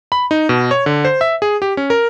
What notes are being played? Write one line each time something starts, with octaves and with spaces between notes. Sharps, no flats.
B5
D#4
B2
C#5
D3
C5
E5
G#4
G4
C#4
A#4